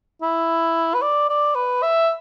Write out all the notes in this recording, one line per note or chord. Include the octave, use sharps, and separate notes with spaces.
E4
B4
D5
D5
B4
E5